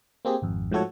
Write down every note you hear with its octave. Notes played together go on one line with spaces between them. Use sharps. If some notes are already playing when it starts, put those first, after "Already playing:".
A#3 C4 G4 G#4
G#1 F2
G#2 F3 A3 F#4 A4 C#5